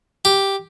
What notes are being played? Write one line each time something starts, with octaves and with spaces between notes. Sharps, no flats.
G4